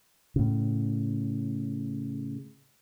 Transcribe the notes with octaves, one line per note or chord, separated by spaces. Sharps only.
A2 C#3